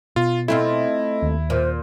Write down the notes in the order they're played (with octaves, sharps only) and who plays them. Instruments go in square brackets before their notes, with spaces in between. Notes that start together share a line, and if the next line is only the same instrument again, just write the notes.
[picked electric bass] B2 [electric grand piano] F4
[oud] A3 C4 F4 [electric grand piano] E4 [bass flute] D#5
[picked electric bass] D#2
[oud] A#2 [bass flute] C5